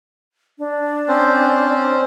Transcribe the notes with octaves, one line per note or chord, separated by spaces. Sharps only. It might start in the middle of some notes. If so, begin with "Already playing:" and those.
D4
C4 C#4 C5